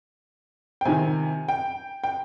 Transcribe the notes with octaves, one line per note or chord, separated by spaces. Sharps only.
G5
C3 D#3 G#5
G5
G5